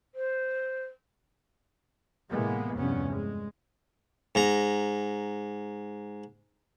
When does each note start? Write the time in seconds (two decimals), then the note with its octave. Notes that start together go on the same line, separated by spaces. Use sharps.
0.15 C5
2.31 A2 C3 E3 G#3 A#3 B3
2.76 F1 E2 G2 C3 B3 C#4
3.10 G#3
4.35 G#2 A#5